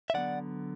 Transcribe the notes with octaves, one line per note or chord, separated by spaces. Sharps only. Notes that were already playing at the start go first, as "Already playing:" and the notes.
E5
D3 F#3 B3 D5 F#5